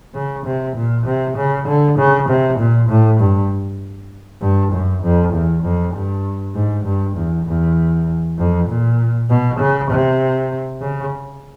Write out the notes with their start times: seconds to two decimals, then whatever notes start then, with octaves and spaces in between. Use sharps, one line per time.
0.15 C#3
0.46 C3
0.76 A#2
1.06 C3
1.37 C#3
1.67 D3
1.98 C#3
2.29 C3
2.59 A#2
2.89 A2
3.20 G2
4.41 G2
4.72 F#2
5.03 F2
5.33 E2
5.63 F2
5.95 G2
6.55 G#2
6.85 G2
7.16 E2
7.46 E2
8.38 F2
8.69 A#2
9.30 B2
9.60 C#3
9.90 C3
10.82 C#3